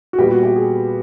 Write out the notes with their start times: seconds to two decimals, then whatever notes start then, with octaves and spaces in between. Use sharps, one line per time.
0.13 F#4
0.18 A#2 G3 B3 G4
0.31 F#4
0.43 G4
0.56 G#4